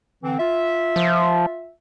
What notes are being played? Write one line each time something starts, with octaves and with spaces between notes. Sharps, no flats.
D3 E3 C4
F4 E5
F3